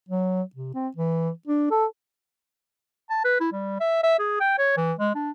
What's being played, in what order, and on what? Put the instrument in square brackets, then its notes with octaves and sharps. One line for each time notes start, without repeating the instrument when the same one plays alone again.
[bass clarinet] F#3
C3
C4
E3
D4
A4
[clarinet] A5
B4
E4
G3
E5
E5
G#4
G5
C#5
E3
G#3
D4